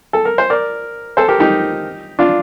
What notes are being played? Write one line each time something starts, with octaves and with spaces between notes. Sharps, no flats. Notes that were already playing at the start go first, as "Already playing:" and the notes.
A4
A#4
C5
A#4 D5
A4 C5
G4 A#4
D#4 G4
D4 F4